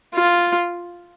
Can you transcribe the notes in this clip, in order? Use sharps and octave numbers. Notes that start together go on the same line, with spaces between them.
F4